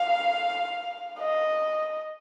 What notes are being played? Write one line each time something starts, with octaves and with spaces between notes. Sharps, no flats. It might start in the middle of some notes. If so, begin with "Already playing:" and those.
Already playing: F5
D#5